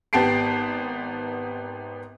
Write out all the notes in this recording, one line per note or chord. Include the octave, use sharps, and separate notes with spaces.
G#1 B3 G4 A5 C7 D7